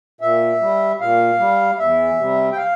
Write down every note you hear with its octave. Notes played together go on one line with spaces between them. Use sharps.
A#2 E5
G3
A#2 F5
G3
E2 E5
C3 G3
G5
F5